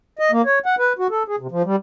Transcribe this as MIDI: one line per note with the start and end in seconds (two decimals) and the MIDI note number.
0.19 0.31 75
0.32 0.42 58
0.45 0.59 73
0.66 0.75 78
0.79 0.93 71
0.99 1.07 66
1.11 1.23 69
1.28 1.36 68
1.40 1.47 48
1.51 1.62 53
1.65 1.76 55